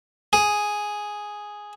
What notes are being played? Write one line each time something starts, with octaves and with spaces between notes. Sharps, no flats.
G#4